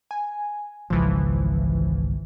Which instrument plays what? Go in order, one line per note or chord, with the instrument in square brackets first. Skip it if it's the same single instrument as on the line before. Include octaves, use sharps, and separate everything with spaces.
[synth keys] G#5
[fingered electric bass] G#1 C#2 [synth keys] E3 F3